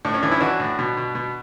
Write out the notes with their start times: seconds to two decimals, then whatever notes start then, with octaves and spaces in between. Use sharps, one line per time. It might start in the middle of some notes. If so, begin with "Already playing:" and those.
0.05 A2 D4
0.14 C#4
0.23 E3 D4
0.31 C#4 E4
0.41 E3 D4 F#4
0.60 A2
0.79 B2
0.97 B2
1.15 B2